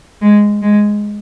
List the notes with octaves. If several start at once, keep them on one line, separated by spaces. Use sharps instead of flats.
G#3
G#3